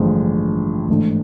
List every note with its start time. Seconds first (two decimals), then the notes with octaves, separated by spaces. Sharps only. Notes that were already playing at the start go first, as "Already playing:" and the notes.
Already playing: A1 G2 D3 F3 G#3
0.88 A1 G#2 E3 A3 D4